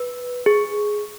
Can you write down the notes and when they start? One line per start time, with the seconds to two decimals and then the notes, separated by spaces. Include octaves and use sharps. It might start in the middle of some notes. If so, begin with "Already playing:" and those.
Already playing: B4
0.46 G#4